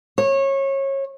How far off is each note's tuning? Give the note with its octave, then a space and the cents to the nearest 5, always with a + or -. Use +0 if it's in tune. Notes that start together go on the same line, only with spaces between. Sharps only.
C#5 -25